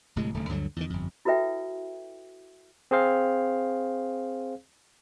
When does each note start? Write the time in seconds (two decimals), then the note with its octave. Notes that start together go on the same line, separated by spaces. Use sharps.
0.16 D1 A2 C3 G#3
0.34 D1 D3 A3
0.49 D2 G2 D3 F#3
0.76 E2 D3 D#3
0.90 G1 F2
1.25 E4 F#4 A4 B4 E5 G5
2.91 C4 G#4 C5 F5